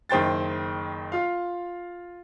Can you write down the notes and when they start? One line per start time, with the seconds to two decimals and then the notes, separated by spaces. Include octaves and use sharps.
0.09 F#1 D#3 C5 G5 A6
1.12 F4 F5